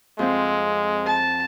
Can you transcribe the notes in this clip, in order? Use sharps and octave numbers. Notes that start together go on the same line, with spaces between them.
F2 G#3 C4
A5